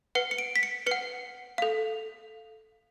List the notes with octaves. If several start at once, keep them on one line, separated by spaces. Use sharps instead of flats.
B4 F#5 C#7
C#7
D7
B6
C#7
B4 F#5 C#7
A4 F5